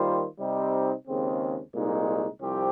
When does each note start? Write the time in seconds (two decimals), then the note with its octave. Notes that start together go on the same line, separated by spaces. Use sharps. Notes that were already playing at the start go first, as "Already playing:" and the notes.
Already playing: D#3 G3 A#3 F4 C5
0.40 C3 G3 C4 D#4
1.06 D#2 C#3 G#3 C4
1.74 C2 A#2 G#3 D#4
2.41 C2 F3 C4 G4